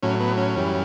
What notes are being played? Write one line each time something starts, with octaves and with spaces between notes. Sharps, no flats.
A2 F#3 C#4
B3
C#4
F#2 E3 G3